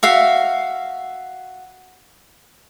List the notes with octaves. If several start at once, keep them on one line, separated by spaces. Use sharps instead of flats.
F#4 E5 F5